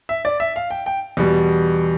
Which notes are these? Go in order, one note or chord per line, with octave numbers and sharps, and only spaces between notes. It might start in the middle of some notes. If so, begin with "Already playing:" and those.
E5
D5
E5
F5
G5
G5
E2 B2 G3